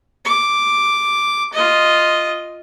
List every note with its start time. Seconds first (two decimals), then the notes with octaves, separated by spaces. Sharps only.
0.25 D6
1.53 F4 D#5